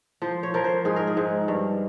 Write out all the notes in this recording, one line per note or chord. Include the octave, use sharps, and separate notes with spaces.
F3 C5
C#5
F3 A#4
C5
G#2 G#4
A#4
G#4
G#2
G2